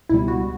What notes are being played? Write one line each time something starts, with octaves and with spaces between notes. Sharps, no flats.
C#2 B2 G3 E4
F#4